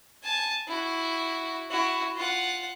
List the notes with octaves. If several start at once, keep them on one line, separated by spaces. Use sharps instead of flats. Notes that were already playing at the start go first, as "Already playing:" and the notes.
G#5 A5
E4 F#4
E4 F#4
F4 F#5